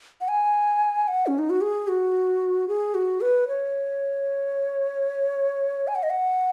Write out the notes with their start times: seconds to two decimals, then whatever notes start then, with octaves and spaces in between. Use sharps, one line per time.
0.21 F#5
0.28 G#5
1.08 F#5
1.27 C#4
1.39 D#4
1.50 F#4
1.61 G#4
1.88 F#4
2.68 G#4
2.95 F#4
3.21 B4
3.48 C#5
5.88 G#5
5.95 F#5
6.03 D#5
6.11 F#5